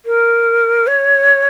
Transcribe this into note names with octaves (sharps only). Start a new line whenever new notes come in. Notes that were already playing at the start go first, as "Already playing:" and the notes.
A#4
C#5